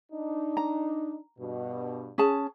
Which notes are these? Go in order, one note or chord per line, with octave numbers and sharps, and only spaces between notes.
D4 D#4
A#5
G2 B2
C#4 G#4 A5